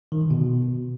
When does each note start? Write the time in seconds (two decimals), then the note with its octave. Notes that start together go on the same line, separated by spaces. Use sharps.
0.12 D#3
0.21 D3
0.31 B2